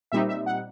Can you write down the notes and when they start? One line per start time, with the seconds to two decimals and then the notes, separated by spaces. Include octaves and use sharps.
0.12 A#2 G3 C4 D#4 E5
0.29 E5
0.46 F#5